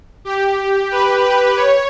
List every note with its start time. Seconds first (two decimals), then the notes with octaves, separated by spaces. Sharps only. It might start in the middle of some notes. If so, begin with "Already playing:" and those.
0.25 G4
0.91 B4
1.24 B4
1.57 C#5